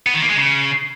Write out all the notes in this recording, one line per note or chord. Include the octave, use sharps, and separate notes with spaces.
B3
D#3
A#3
G#3
C#3